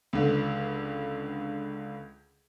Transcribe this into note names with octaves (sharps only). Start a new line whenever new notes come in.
C#2 D3